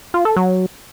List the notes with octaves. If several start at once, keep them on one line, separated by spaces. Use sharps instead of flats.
F4
A4
F#3